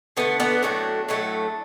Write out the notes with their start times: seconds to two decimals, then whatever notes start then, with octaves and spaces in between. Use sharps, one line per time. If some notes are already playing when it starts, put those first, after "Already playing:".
0.17 D3 A3 B3
0.40 B3 D4
0.63 A2 F#3 A3
1.09 A2 F#3 A3